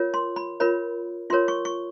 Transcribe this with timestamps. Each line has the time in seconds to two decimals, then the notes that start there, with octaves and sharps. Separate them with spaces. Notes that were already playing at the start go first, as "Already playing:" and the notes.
Already playing: F4 A#4 C#5
0.14 C6
0.36 B5
0.60 F4 A#4 C#5 B5
1.30 F4 A#4 C#5 C6
1.48 C#6
1.65 C#6